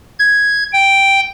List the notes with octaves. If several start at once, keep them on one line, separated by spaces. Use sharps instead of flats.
G#6
G5